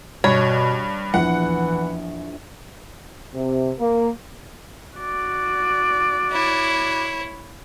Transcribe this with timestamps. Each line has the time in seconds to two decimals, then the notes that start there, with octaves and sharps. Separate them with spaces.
0.24 G2 B2 C#5 G#6
1.14 A#1 E2 E3 F#5
3.33 C3
3.79 A#3
4.96 F#4 D5
6.32 E4 C#5